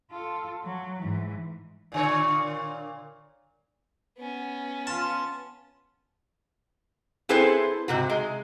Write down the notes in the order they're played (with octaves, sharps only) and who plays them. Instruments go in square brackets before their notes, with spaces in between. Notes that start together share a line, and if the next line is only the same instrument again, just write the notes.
[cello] F4 A4
F#3
G#2 E3
[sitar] A#2 D3 C#5
[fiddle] B3 C#4
[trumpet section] F4 [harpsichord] A5
[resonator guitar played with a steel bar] C4 E4 G#4 A4 B4 C5
G#2 C3 F#4
G#3